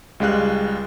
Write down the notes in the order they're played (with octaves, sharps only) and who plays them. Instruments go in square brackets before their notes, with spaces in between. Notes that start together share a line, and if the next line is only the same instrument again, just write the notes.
[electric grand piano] C#2 G3 G#3 F5 F#6